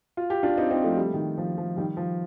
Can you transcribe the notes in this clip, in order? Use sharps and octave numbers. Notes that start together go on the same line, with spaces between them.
F4
G4
D4 F4
C4 D#4
C4 D#4
F3 A3
G3
A3
D#3 G3
F3
F3
D#3 G3
F3